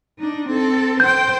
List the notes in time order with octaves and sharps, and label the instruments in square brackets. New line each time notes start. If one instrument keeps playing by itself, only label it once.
[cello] D4 D#4
C4 A4
[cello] C5 G5 [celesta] G6